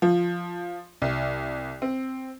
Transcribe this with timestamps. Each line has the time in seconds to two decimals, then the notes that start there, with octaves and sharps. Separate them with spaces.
0.02 F3
1.02 C2
1.82 C4